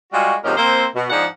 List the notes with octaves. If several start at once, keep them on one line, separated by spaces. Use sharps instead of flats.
G3 G#3 F4 F#4
G#2 C3 F3 A#3 C#4 D#4
A#3 C4 C5
B2
G#2 F3 D4 D#4 G#4 F#5